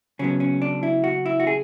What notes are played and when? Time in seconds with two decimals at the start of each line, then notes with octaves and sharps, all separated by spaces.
0.19 C#3 F#3 B3 C#4
0.40 C#4
0.62 D4
0.83 E4
1.04 F#4
1.26 E4
1.40 F#4
1.47 G#4